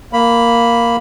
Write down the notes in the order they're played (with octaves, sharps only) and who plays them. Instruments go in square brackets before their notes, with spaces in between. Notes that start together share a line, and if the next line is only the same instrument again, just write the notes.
[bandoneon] A#3 B5